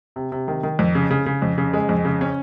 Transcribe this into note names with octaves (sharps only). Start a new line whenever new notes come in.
C3
C3
D#3
D#3
F2
C#3
C#3
C#3
F2
C#3
G#3
F2
C#3
C#4